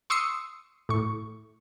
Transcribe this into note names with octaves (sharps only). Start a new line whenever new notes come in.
C6 C#6 D#6 E6 C7 C#7
A2 C#6